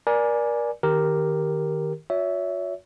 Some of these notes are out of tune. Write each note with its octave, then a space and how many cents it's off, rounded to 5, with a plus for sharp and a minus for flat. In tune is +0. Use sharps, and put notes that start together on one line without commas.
A#4 +30 D5 +0 G#5 +10
D#3 -5 G4 +0 A#4 +0
F#4 -40 C#5 +30 E5 -5